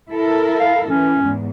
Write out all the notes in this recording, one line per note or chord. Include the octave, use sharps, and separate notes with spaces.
E4 A4 A#4
F5
E3 C#4
E2 G#2